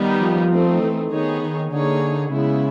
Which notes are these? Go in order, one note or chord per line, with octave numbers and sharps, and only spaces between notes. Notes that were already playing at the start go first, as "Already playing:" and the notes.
Already playing: D#3 G3 B3 D#4 G4
F3
A3 C4 D#4
E3
D#3 B3 D#4 G#4 C#5
D#3
D3 A#3 D#4 G#4 C#5
C#3 G#3 B3 E4